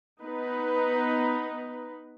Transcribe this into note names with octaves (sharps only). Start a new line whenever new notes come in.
B3 D#4 B4